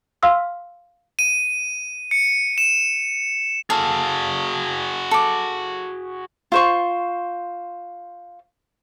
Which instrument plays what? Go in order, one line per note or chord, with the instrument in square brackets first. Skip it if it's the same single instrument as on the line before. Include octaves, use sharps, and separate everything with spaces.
[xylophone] F5 C6 E6 F6
[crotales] D#7
C#7
E7
[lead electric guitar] F#4 G#4 [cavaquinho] A4 F5
[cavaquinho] A4 D6
F4 C5 C#6